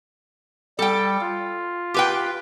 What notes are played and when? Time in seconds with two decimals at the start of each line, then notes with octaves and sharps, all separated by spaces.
0.79 G3 A4 G5
1.20 F4
1.94 G4 B4 G5